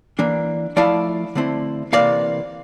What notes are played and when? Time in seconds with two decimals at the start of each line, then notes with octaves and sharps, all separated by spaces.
0.19 E3 A#3 D4
0.77 F3 A3 E4 D5 F5
1.35 D3 A3 C4 E4
1.93 C3 E3 A#3 D5 F5